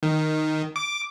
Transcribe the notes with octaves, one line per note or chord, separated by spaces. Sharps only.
D#3
D6